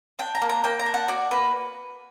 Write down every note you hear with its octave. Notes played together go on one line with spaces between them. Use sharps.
D4 G5
A#5
A#3
A#5
A#3 G5
A#5
D4
F#5
F#4 D5
A#3 B4